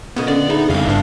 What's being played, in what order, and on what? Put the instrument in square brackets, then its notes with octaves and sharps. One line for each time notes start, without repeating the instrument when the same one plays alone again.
[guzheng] A#2 C#3 D#5 [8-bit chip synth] B3
[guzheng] D3 [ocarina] C#4 [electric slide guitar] D5
[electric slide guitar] D#4 [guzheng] E4 [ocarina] G#4
[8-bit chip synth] F2 F5 [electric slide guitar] C#3 G3 [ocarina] D#4
[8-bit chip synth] G1 G2 D4 [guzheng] E5 F5